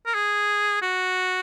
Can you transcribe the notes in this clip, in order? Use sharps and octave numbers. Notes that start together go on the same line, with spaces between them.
A#4
G#4
F#4